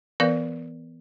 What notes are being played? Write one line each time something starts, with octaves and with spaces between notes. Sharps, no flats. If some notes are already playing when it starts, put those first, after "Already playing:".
E3 B3 A#4 B4 D5 F5